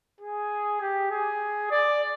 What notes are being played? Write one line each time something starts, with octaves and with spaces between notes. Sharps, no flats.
G#4
G4
G#4
D5